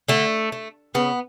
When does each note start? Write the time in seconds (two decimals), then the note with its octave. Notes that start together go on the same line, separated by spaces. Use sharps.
0.08 D3 A3
0.52 A3
0.95 C#3 B3